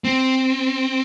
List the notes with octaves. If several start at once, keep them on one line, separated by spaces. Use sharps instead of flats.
C4